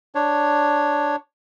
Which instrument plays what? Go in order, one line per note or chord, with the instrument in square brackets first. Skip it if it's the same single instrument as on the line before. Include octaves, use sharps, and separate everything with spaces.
[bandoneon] D4 C#5